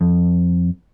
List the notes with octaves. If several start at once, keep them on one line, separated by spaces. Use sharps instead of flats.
F2